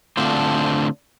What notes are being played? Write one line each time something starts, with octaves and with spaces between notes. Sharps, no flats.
D3 A3 C4 D4 F4 C5